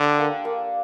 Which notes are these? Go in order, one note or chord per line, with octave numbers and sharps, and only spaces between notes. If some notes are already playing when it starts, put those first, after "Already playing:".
Already playing: D3 D4 G4
A#3
A#3